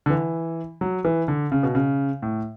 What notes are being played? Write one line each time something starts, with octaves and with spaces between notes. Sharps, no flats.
D3
E3
F#3
E3
D3
C#3
B2
C#3
A2